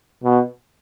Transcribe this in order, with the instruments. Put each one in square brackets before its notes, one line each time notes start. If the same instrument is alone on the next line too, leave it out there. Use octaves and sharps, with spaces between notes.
[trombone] B2